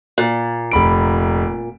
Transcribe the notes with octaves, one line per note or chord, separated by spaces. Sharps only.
A#2
F1 B5 D7